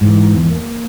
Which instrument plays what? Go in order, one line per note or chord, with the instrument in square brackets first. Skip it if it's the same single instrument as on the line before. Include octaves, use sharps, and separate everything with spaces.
[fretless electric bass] G#2 E3
E2
A#3